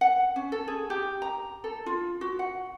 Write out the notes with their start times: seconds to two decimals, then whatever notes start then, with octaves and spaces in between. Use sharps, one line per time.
0.01 F#5
0.36 C#4
0.52 A4
0.68 G#4
0.90 G4
1.22 A#5
1.64 A4
1.86 F4
2.21 F#4
2.39 F#5